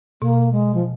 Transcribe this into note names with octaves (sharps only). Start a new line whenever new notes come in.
B2 A#3
G#3
F3